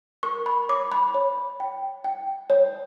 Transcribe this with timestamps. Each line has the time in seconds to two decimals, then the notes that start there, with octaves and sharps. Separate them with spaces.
0.23 A#4 C#6
0.46 B5
0.69 C#5 D6
0.92 B5
1.14 C#5
1.60 G5
2.04 G5
2.50 C#5